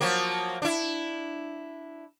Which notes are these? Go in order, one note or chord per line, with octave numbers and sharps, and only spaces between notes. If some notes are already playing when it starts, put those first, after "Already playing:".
F3 F#3 A#3
D4 E4